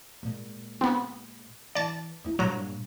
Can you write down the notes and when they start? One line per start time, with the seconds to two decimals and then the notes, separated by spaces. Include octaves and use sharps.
0.23 A#2 G#3
0.81 B3 C4
1.75 E3 D5 A5
2.24 C#4 E4
2.39 G2 A#2 F#3 A#5